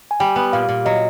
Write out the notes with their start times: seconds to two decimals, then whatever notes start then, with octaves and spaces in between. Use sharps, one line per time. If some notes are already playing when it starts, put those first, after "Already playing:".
0.11 G#5
0.20 G3 G5
0.36 B3
0.53 A#2 F5
0.63 F5
0.69 A#2
0.85 F#3 D#5